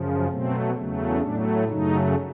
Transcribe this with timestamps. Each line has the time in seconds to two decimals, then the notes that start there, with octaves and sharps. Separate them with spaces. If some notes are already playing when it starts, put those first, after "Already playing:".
Already playing: F#2 C#3 F3
0.27 B2 F#3 A3 C4
0.74 E2 C#3 F#3 A3
1.21 A2 F#3 A3 D4
1.68 F#2 C#3 F#3 A3 D#4